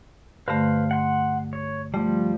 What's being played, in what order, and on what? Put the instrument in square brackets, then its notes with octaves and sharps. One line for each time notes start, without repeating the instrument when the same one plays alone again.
[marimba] G2 D3 A3 [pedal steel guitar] B4 C5 F5
[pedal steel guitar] F#5 C6
C#5
[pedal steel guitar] F3 G3 [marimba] A3